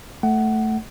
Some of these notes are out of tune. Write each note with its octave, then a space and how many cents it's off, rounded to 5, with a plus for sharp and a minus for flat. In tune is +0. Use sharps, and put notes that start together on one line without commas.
A3 +0 F#5 +20